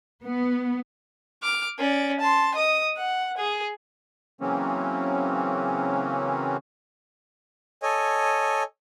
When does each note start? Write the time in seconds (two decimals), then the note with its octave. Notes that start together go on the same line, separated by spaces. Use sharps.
0.24 B3
1.43 D6 F6
1.78 C#4 D5
2.20 A5 C6
2.55 D#5 D#6
2.96 F#5
3.37 G#4
4.41 C#3 E3 F#3 A#3 C4 C#4
7.82 A4 C#5 D#5 G#5